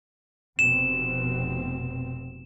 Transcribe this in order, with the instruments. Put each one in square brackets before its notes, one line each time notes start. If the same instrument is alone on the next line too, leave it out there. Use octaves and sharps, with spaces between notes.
[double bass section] F1 B2 C4 [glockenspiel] E7